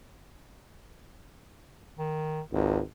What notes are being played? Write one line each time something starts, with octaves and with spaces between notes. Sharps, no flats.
D#3
G#1 C#2